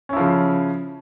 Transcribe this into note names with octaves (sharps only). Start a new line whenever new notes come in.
C#3 F3 C#4 E4